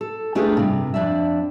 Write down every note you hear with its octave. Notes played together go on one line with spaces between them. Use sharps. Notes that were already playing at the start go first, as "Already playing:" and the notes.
A4
A3 D4 F4 G4 G#4 B4
G2 C3
F2 D4 D5 E5